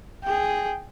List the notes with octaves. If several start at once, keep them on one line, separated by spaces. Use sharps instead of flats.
G#4 G5